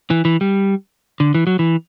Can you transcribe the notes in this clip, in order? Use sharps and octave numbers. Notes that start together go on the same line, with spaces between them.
E3
E3
G3
D3
E3
F#3
E3